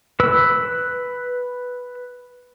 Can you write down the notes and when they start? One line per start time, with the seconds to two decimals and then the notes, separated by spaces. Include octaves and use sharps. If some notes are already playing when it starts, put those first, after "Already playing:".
0.20 B4 E6